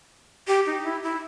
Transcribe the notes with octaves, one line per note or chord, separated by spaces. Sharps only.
G4
D#4
E4
E4